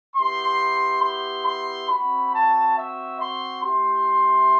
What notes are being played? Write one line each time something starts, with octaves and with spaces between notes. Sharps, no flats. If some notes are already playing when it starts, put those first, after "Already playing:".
B3 E4 G4 C6
C6
C6
C4 F#4 B5
A5
E5
C6
A3 E4 G4 C6